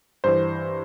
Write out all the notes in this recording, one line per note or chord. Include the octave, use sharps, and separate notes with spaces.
G2 E3 C5